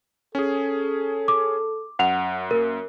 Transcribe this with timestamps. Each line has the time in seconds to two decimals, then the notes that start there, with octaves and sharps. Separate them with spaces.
0.35 C#4 G#4 A4
1.28 D6
1.99 F#2 F#5 F7
2.51 A#3 A#4